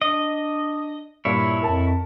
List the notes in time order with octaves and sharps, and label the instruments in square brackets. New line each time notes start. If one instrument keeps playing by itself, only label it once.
[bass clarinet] D4 [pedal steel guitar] D#5
[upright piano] G2 A#2 [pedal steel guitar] E4 C#5
[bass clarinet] F2 [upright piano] A#4 A5